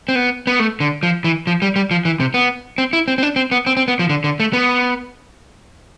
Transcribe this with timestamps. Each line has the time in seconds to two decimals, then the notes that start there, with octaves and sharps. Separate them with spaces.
0.09 C4
0.15 B3
0.47 B3
0.60 A3
0.80 D3
1.03 F3
1.24 E3
1.47 F3
1.62 G3
1.76 G3
1.91 F3
2.05 E3
2.20 C3
2.34 B3
2.78 C4
2.93 E4
3.08 C4
3.18 C4
3.23 D4
3.36 C4
3.51 B3
3.66 C4
3.77 C4
3.88 B3
3.99 F3
4.09 D3
4.24 D3
4.40 A3
4.53 B3